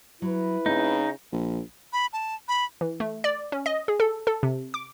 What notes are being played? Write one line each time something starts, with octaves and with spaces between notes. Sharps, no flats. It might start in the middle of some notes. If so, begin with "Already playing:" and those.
F#3 E4 B4
C#3 A3 C4 D#4
A#1
B5
A5
B5
E3
A3
D5
C#4
D#5
G#4
A4
A4
C3
D6